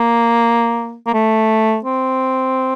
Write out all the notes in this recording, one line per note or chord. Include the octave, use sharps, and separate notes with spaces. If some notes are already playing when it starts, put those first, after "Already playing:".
Already playing: A#3
A#3
A3
C4